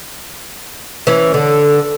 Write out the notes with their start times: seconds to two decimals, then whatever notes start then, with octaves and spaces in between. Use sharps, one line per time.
1.07 E3 C#4
1.34 D3